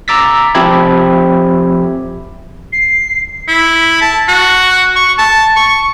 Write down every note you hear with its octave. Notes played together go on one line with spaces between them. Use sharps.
A#5 D6 E6 A6 B6
F3 C4 G4 E5 B5 G#6
C7
E4
A5
F#4
C#6
A5
C#6